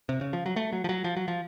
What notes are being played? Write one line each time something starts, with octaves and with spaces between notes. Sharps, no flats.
C3
C#3
F3
F#3
A3
F#3
F3
F#3
F3
F#3
F3